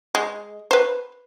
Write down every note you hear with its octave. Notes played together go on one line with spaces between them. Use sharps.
G#3
B4 C5